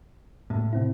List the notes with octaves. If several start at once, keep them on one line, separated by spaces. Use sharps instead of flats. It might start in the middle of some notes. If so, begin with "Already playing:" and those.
A2
C3 C4 E4